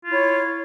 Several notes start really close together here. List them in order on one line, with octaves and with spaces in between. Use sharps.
F4 E4 C#5